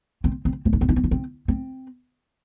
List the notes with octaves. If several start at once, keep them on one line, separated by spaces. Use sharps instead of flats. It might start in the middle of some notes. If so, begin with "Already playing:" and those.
C4
C4
C4
D4
C4
D4
C4
D4
C4
C4